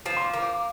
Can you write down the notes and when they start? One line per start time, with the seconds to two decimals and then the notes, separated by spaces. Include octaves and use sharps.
0.06 F3 C7
0.17 C6
0.24 D6
0.33 A#3
0.43 D6